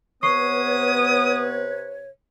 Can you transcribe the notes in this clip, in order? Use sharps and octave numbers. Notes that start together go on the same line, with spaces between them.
C3 B3 B4 C#5 C#6 D#6 C7